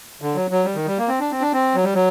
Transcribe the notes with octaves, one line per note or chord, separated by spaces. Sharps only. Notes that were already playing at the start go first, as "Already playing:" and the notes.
D3
F#3
F#3
G3
D#3
G3
A#3
C4
D4
C4
D4
C4
F#3
G3
F#3